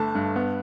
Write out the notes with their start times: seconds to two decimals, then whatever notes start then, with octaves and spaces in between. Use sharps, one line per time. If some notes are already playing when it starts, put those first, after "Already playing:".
Already playing: G1 A3 A5
0.15 G2
0.36 B3